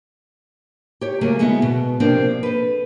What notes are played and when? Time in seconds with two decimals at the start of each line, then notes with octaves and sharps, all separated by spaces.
1.01 G4 C#5
1.21 C#3 F#3 A3 A#3 G#5
1.39 D2 G#3 B3 E4 E5
1.62 B2
2.00 C3 F3 A#3 C4 D4
2.43 A4 B4